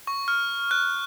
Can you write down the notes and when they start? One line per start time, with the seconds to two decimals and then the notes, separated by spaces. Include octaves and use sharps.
0.07 C#6
0.28 F6
0.71 F#6